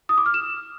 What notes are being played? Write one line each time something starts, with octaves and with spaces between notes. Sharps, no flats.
D#6
D6
F6
E7